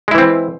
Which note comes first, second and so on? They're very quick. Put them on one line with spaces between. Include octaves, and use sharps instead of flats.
G#3 E4 E3 C4